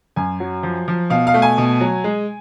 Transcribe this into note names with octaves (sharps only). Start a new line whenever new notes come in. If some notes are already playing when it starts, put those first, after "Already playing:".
F#2 G#5
F#3
F3
F3
B2 F5
F5
A3
G#5
B2
F#3
G#3